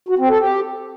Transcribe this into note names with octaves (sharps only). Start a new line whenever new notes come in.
F#4
C4
A4
G4